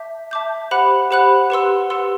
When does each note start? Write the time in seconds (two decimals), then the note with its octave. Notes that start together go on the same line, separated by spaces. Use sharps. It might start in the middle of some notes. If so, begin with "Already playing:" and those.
Already playing: E5 A5 D6 G6
0.31 E5 A5 D6 G6
0.71 G4 C5 F#5 B5 F#6
1.11 G4 C5 F#5 B5 F#6
1.50 G4 B4 F#5 C6 E6
1.90 G4 B4 F#5 C6 E6